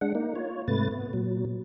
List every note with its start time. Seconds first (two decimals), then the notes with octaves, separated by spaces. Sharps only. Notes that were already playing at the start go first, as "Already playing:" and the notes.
0.01 G#3 D4 F#5
0.15 A#3 D#4
0.35 F4 C#5
0.68 G#2 C3 A3 B4 A6
0.92 B3
1.13 A#2 F#3